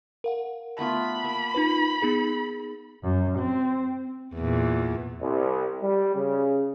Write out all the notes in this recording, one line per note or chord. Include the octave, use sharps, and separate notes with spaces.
A#4 F5 F#5
A3 B3 F4 B5
A#3
D#4 F4 B4
B3 D#4 G#4
F#2
C4
E2 A#2
C2
G3
C#3